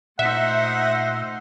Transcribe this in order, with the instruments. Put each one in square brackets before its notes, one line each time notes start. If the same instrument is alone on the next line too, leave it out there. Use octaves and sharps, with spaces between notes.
[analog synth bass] A#2 [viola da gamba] A3 D#4 C5 [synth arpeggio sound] E5 [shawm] F#5